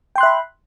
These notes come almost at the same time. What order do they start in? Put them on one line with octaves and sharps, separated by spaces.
G5 C6 F#6 E5 B5